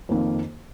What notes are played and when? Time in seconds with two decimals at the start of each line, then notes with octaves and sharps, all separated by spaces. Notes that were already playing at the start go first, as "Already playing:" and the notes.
0.09 F2 D#3 A#3